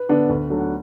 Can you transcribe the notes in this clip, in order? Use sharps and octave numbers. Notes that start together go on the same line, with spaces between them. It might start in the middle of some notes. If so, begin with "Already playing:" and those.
Already playing: B4
D3 B3 D4
D2
D3 F#3 A3
F#5